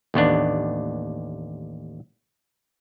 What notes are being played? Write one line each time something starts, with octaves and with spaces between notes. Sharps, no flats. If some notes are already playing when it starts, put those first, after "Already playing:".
A1 D#2 B3 D4